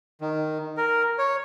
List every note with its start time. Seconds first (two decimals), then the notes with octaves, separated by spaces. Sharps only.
0.21 D#3
0.77 A#4
1.18 C#5